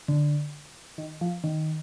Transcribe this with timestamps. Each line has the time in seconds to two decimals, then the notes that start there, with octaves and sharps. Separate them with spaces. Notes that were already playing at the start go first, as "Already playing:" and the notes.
0.08 D3
0.98 D#3
1.21 F3
1.44 D#3